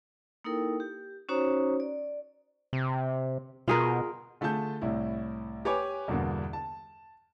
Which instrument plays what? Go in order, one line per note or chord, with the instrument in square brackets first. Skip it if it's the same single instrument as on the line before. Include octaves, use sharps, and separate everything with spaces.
[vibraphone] A#3 D#4 E4 A4 A#4 G5
G4
C#4 D#4 F#4 C5 C#5 A#5
D5
[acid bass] C3
[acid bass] B2 [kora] F4 G#4 A#4
[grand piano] D3 A3 F4 G#4 A5 G6
C2 A2 E4
G4 B4 C#5 G#5 D6
E2 G2 B2 D3 A#3
A5